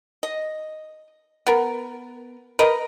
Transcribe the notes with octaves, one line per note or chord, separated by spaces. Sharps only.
D#5
B3 A#4
A#4 B4 D#5